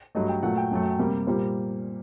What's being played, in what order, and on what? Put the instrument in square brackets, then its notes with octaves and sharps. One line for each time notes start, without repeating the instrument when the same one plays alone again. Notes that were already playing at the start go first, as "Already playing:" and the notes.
[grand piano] G2 F#3 A3 D#5
G5
A#2 F#3 A3 F#5
G5
F#2 F#3 A3
C3 G3 A#3
A#2 G3 A#3 C5